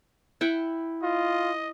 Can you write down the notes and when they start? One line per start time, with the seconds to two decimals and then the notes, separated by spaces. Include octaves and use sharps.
0.41 E4 F#5 G5
1.03 F4 D#5